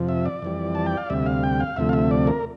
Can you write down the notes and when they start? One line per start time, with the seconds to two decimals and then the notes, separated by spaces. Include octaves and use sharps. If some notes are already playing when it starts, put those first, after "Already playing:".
Already playing: F2 C3 F3
0.09 E5
0.26 D5
0.42 F2 E3 G3
0.75 A5
0.86 G5
0.97 F5
1.10 D2 C3 G3 E5
1.26 F5
1.43 G5
1.60 F5
1.76 D2 C3 F3 A3 E5
1.89 F5
1.93 E5
2.11 D5
2.27 A#4